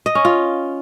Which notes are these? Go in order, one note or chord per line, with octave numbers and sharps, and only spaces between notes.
D#5
C#4
F4